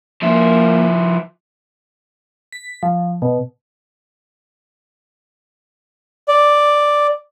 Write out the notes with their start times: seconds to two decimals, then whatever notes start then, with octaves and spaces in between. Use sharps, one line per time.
0.22 F3 A#3 E4
2.52 B6
2.83 F3
3.22 B2
6.28 D5